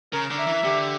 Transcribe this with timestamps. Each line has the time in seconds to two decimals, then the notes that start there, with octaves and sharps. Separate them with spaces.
0.13 C#3 A#4
0.31 D3
0.39 E5
0.47 E3
0.64 D3 G4